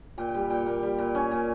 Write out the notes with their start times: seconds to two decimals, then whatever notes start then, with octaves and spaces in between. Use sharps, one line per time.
0.18 A#2 G5
0.29 G5
0.34 G3
0.50 A#2 G5
0.66 A#3
0.83 G3
0.99 A#2
1.15 C#4 G#5
1.31 A#2